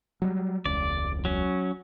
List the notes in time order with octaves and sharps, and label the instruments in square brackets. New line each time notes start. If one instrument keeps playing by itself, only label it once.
[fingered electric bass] F#3 G3
[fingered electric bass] E1 C#2 [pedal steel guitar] D5
[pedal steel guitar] F#3 C#4